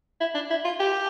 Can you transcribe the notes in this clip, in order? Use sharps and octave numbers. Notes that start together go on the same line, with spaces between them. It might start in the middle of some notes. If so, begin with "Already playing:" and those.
E4
D4
E4
F4
G4